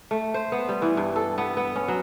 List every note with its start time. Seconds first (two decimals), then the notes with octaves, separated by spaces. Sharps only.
0.11 A3
0.34 C5
0.52 B3
0.69 G3
0.82 E3
0.97 G2
1.16 A4
1.38 B3
1.57 B3
1.76 C#4
1.88 F#3